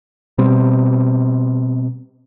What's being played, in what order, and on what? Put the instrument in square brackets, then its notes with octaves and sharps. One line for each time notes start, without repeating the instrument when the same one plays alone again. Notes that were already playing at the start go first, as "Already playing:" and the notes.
[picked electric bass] B2 G3 C4